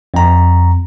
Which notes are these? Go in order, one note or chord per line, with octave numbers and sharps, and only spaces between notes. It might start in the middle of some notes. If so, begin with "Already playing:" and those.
F2 A#5